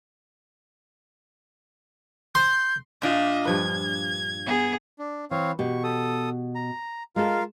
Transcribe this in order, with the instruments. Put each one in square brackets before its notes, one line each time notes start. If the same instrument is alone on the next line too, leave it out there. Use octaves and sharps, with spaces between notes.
[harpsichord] C6 [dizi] G6
[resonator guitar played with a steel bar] A#2 D4 F4 [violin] D#5 E5
[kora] G2 F3 B4 [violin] G#6
[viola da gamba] B3 G#4
[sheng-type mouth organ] D4
[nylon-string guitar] E3 [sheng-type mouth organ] C4 C#5 F5
[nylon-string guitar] B2 G4 [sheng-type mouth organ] C#6
[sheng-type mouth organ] A4 D#6
A#5
[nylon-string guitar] G#3 A4 [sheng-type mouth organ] F4 A#4 F5